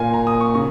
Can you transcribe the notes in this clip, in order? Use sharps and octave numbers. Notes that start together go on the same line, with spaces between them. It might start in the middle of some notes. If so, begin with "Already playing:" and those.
Already playing: A#2 A#3 F4 G#5
A#5
D#6
C#6
C#3 C#6